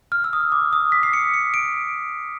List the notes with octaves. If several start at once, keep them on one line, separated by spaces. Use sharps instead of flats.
F6
E6
D#6
D6
D#6
B6
C7
C#7
C#7
D7